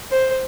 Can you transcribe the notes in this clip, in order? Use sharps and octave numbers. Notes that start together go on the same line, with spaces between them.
C5